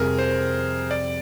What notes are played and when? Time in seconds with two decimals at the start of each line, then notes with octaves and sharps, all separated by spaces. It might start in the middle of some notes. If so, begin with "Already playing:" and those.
Already playing: F2 C3 G3 G#4 A#4
0.18 C5
0.91 D5